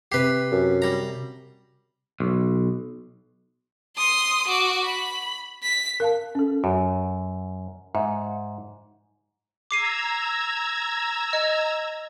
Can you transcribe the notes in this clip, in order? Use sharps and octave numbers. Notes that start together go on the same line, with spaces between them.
C3 G4 B4 C7
F#2
G3 A#5
B1
C6 D#6
F#4 D6
B5
B6
A#4 F5 A5
C#4 A4
F#2 F#4
G#2 E5
A#5 D6 E6 G#6 C7 D#7
D#5